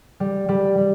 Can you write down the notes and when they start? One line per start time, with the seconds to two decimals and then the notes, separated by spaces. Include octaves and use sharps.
0.20 G3
0.49 G3
0.78 G3